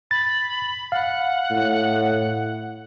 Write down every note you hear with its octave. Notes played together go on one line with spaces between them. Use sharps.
B5 A6
F5 F#5
A2